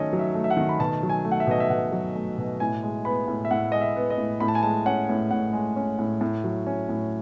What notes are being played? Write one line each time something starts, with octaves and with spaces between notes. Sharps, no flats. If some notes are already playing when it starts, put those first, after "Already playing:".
Already playing: D#3 F#3 A3 C#4 D#5
F#3
E5
A3
E5
F#5
D#3
B5
B2 A5
F#3
G#5
A3
F#5
E5
B2 D#5
E5
B2 F#5
F#3
A3
B2
A2 G#5
G#3
B3 B5
A2
E5
A2 F#5
G#3 D#5
E5
B3
D#5
A2
A2 B5
A5
G#5
G#3 A5
C#4 F#5
A2
A2 F#5
G#3
C#4
A2
A2
F#3
C#4
A2